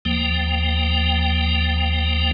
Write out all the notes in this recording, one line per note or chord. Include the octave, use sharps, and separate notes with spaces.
D#2 F3 A#3 G5